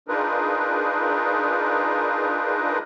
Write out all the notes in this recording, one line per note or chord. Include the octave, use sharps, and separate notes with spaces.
D4 D#4 F4 G#4 A#4 B4